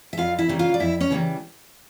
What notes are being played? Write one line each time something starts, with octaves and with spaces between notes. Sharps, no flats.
E5
F2 F4 F5
E4 E5
C#3 E3 G3 A#3
F4 F5
D5
F2 E4 E5
C#4 C#5
C#3 E3 G3 A#3